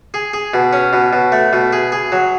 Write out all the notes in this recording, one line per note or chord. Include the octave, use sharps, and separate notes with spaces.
G#4
G#4
B2
C#4
B2
B2
A3
B2
G#4
G#4
F#3